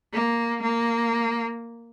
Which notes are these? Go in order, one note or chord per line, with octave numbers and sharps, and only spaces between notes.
A#3
A#3